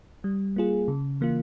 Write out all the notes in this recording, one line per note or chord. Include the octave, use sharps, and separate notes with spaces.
G3
A#3 F4 G#4
C#3
E3 A#3 F4